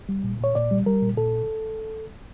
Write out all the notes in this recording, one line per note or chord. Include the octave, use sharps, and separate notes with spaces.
G3
A#2
A#2 C#5
A#2 D5
G3
G3 A#4
A#2
A#2 A4